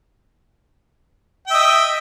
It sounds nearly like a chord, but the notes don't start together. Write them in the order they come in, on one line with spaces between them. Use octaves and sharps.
G5 E5 D#5